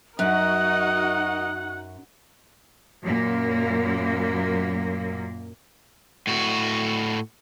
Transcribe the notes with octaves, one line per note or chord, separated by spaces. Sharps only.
F#2 D#4 F#4 A#4 D#5 F#5 F#6
F#2 A#2 A#3
A2 F#4